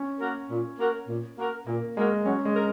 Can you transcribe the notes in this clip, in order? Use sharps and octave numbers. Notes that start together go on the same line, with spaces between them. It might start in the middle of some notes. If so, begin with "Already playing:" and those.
Already playing: C#4
A#3 F#4 A#4
A#2
A#3 F#4 A#4
A#2
A#3 F#4 A#4
A#2 A#3
G#3 A#3 F#4 A#4
F#3 C#4
G#3
A#4